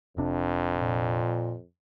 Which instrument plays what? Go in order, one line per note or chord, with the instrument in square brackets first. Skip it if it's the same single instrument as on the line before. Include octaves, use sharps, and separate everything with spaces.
[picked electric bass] F1 C3 D4 [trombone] F2
[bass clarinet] A#2